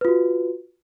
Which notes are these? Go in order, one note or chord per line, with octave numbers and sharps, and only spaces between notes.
F4 F#4 B4